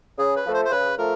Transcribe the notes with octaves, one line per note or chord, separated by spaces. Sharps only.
C#3 G#4
B4
F3 A3
C5
C5
C#3 B4
F3 A3 A#4